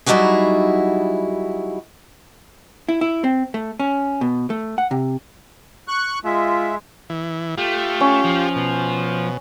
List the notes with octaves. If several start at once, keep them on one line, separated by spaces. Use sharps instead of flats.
F#3 G3 D#4 E4 F#4 G#4
E4
E4
C4
A3
C#4
B2
A3
F#5
C3
C#6 F#6
G#3 F4 E5
E3
A3 F4 G4
C#4
F3
B2